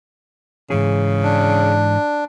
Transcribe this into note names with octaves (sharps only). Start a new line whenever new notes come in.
G#2 C#3 E3 G#4
D4